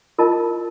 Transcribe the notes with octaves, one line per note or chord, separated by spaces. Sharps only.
F4 A#4 D#5 A5